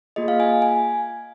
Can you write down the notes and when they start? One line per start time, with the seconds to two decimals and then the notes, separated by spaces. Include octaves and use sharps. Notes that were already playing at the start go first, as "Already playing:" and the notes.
0.16 A#3 F4 G#4 D#5
0.28 F5
0.40 G#5
0.62 G#5